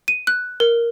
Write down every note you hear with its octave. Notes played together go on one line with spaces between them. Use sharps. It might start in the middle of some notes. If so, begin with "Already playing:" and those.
D#7
F#6
A#4